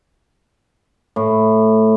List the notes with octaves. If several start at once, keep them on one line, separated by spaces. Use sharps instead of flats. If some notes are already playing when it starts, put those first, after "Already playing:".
A2